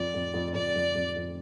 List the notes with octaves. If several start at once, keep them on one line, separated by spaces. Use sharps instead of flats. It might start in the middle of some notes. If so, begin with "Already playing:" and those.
Already playing: F2 D5
F2
F2
F2 D5
F2
F2
F2